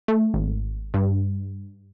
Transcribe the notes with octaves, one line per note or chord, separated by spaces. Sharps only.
A3
G#1
G2